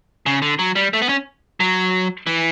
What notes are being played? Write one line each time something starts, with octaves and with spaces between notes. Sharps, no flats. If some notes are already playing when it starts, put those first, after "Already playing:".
C#3
D3
F#3
G3
A3
B3
C#4
F#3
E3